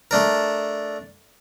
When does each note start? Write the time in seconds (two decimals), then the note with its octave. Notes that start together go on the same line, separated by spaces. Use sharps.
0.11 A3 D4 A#4